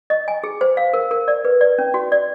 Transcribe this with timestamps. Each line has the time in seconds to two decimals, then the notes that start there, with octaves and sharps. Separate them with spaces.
0.10 D#5
0.28 G#5
0.44 G#4
0.61 C5
0.77 F5
0.94 A#4
1.11 A#4
1.28 D5
1.45 B4
1.61 D5
1.78 C#4
1.94 F#4
2.12 D5